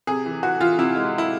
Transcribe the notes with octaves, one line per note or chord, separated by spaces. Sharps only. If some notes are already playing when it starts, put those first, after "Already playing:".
C3 G#4
E3
E3 F#4
E3 F4
C3 E4
G#3
E4